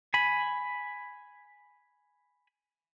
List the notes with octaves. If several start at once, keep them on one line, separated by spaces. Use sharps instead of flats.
G#5 B5